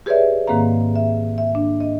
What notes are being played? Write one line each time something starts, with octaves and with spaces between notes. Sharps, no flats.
G4 G#4 B4 C#5 D5 E5
G#2 D#3 A#3 C4 F5 A#5
E5
E5
D4
D#5